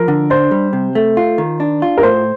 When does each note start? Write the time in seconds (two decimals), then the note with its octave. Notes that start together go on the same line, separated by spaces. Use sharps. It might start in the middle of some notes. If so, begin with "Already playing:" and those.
Already playing: F3 A#4
0.08 D3
0.30 D4 C5
0.51 G3
0.73 C3
0.95 A3
1.17 F4
1.38 D#3
1.60 D4
1.82 F4
1.98 A#4
2.03 A2 C5